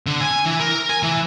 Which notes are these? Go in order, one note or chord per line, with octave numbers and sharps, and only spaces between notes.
D3
G#5
E3
A#4
G#5
E3